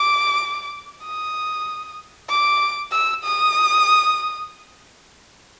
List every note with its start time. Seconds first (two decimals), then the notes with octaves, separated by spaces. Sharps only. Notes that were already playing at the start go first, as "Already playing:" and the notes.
Already playing: D6
1.04 D#6
2.29 D6
2.92 E6
3.24 D#6